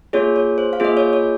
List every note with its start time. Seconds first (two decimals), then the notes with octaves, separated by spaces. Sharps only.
0.13 A#3 F4 G#4 C#5
0.36 C#5
0.58 C5
0.73 F5
0.80 A#3 F4 G#4 D#5
0.97 C#5
1.13 C#5